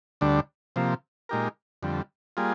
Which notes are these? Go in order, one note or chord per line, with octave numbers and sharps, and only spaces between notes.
D2 D3 G3 D4
C3 F3 A#3
A#2 G#3 D#4 G4 A#4
F2 D3 G3
G3 A#3 F4 G#4